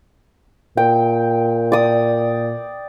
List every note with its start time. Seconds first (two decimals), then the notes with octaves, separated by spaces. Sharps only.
0.77 A#2 G5
1.72 D5 D#6